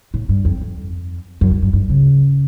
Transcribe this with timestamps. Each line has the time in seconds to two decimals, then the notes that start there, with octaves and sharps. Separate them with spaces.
0.14 A2
0.29 G2
0.45 F2
0.61 F2
1.41 F#2
1.51 G2
1.62 G2
1.73 G2
1.90 C#3